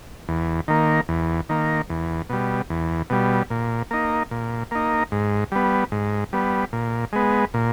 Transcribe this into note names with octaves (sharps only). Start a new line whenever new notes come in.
E2
D#3 A#3
E2
D#3 A#3
E2
B2 G3
E2
B2 G3
A#2
A#3 D#4
A#2
A#3 D#4
G#2
G3 B3
G#2
G3 B3
A#2
G#3 B3
A#2